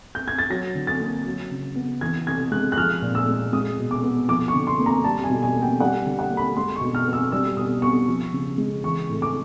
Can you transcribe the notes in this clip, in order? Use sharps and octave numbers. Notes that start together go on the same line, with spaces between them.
G6
G#6
A6
F#3 A#6
D3
A6
A#3
F#3
C#3
B3
E3 G#6
C3 G#6
G#3 F#6
F#6
F3 F6
A#2
E6
G#3
G#3 D#6
B2
D6
B3
F3 D6
C#6
D3
C6
A#3
A#5
G3 A5
G#5
B2
G#5
A#3
G5
G3 F#5
D3
F#5
A#3
B5
G#3 C6
C#6
B2
F6
B3
E6
G3 E6
B2 D#6
B3 C#6
F3
C#3
G#3
E3 C#6
A2
D6